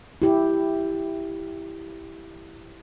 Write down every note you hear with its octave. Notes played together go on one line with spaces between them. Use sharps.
E4 G4